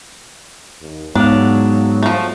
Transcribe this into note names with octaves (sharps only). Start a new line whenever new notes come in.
D#2
G#2 F#3 B3 D4 F5
F3 A3